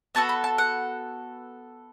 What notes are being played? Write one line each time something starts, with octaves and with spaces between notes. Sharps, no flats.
B3 F#4 A4 A5
B5
A5
F#5